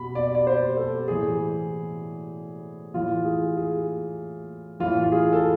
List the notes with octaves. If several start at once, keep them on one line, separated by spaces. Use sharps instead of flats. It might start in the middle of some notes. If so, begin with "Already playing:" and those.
Already playing: B2 B5
D5
D5
C5
A4
A2 E3 G#4
A2 E3 F4
G#4
G#4
A2 E3 F4
F4
G#4
A4